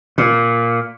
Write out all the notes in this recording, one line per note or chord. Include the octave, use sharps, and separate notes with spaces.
A#2